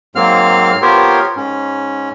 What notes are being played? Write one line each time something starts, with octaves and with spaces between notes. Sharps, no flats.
G#2 F#3 A#3 C4 F5 F6
B3 F4 G4 A#4 C5 C#5
G#2 C#4